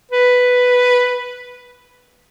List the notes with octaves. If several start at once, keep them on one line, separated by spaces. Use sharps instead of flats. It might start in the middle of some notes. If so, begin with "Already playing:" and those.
B4